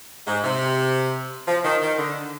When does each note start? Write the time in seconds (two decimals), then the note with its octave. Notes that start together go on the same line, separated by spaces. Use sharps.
0.27 G#2
0.44 C3
1.47 F3
1.65 D#3
1.82 D#3
1.99 D3